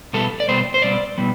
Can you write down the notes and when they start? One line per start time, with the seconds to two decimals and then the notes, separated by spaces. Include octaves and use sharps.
0.13 B2 G3 B3 A4
0.40 D5
0.48 B2 G3 B3 C5
0.74 C5
0.82 B2 G3 B3 D5
1.18 B2 G3 B3